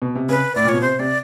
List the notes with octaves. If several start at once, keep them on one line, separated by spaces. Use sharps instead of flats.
B2
C3
C#3 B4
A2 D5
A#2
B2 C#5
C3 C5
C3 D5